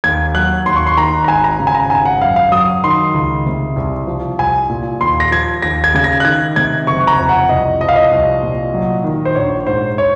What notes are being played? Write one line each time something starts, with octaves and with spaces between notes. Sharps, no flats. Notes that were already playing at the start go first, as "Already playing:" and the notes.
D#2 G#6
F#3 F#6
D#2 C6
C#6
C6
D#3 A#5
A#5
G#1 G#5
A#5
C#3
G#5
A#5
G#1 G#5
F#5
F#2 F5
F5
F#3 D#6
D#3 C6
C#2
C3
C2
F3
C2 G#5
A#2
D#2 C6
A#6
F3 G#6
D#2 A#6
G#6
C#3 G#6
A#6
F#6
D#3 G#6
C3 G#6
F#1 C#6
A#5
F2
F#5
C2 D#5
F3 D#5
F5
D#5
C2
A#2
F#3
D#3
C5
A#1 C#5
G#2 C5
C#5